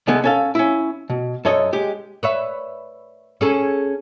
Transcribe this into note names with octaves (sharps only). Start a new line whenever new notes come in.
C2 D#3 G#3 B3 A4 G#5
C#4 A4 F5
C#4 E4
B2
F#2 A4 C#5 D#5
G#3 G4
B4 C#5 E5
C#4 G#4 A4